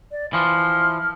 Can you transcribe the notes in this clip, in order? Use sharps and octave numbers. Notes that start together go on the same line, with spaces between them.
D5
E3 F3 F6